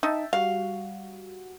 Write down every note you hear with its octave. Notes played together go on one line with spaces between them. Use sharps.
D#4 E5 G5 A5
G3 F#4 F5